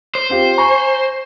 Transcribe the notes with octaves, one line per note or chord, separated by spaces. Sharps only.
C5
C4 F4 G4
G#5 A#5 C#6